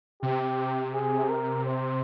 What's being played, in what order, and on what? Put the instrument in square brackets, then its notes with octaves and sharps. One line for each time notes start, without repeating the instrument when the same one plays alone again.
[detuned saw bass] C3 [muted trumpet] G4
[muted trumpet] G#4
A#4
C5